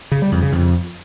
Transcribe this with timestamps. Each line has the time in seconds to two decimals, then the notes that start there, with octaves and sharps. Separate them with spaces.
0.12 C#3
0.22 G3
0.32 F2
0.42 C#3
0.52 F2